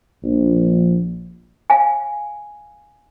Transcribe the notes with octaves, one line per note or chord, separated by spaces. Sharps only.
A#1
F5 G#5